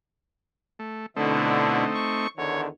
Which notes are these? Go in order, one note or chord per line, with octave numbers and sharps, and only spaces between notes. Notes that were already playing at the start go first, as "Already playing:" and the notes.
A3
B2 D3 A3 C4 D#4 E4
C#6
E2 D3 D#3 C#5